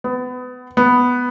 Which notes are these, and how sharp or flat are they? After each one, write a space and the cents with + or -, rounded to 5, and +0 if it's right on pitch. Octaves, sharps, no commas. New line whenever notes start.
B3 +25
B3 +0